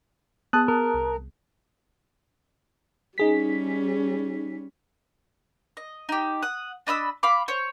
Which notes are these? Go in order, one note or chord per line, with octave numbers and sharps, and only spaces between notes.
B3 G#4 A5 D#6 F#6
A#4
C2
G3 C#4 D#4 G#4 B6
D#5
D#4 G4
F#5 D#6
D4 D#5 B5 E6
F5 B5 D6
C5 C#5